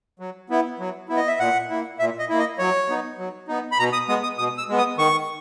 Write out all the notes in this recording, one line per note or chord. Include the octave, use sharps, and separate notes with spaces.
F#3
B3 E4
F#3
B3 E4
D#5
E5
A#2 F#5
A#3 E4
A#2 E5
D#5
A#3 E4
D#5
F#3 C#5
B3 D#4
F#3
B3 D#4
B5
B2 A#5
D#6
G#3 B3 D#6
D#6
B2 D#6
E6
G#3 B3
D#6
D#3 C#6